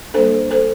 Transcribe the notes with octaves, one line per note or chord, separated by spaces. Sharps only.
G3 A#3 D4 A4 C5
A4 C5